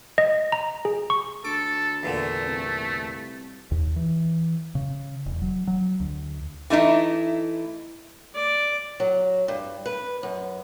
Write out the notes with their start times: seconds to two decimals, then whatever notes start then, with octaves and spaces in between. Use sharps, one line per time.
0.18 D#5
0.52 A#5
0.85 G#4
1.10 C#6
1.45 D2 A4 D6
2.03 E2 A#2 D3 A3
2.46 C2
3.71 D#2
3.96 E3
4.75 C#3
5.26 E1
5.42 F#3
5.67 F#3
6.00 D2
6.70 E3 A3 D#4 E4
8.35 D5
9.00 F#3
9.48 G2
9.86 B4
10.23 F#2